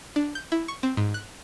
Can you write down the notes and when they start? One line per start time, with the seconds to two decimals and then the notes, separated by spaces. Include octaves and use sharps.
0.16 D4
0.35 G6
0.52 E4
0.68 C#6
0.83 C4
0.97 G#2
1.14 F#6